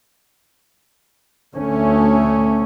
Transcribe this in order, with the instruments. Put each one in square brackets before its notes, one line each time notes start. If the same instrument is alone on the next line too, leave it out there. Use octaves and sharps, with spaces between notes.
[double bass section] D2 A3 C#4